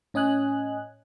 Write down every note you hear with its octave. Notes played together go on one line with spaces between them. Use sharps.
A2 C#4 D#5 G#5 F#6